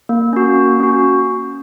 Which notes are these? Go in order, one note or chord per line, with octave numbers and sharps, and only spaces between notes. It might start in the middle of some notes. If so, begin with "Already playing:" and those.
A#3
C#4 F#4
A#3
C#4 F#4